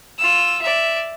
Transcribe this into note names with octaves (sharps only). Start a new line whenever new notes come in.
F4 E6
D5 E5